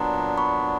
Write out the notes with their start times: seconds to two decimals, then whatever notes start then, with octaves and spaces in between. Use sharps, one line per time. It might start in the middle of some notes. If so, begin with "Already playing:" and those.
Already playing: A#2 F#3 B3 D4 A#5 C6
0.37 B5 C#6